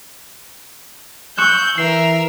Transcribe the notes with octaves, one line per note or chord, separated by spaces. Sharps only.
C#6 E6 F#6 G6
E3 A#4 E5 C7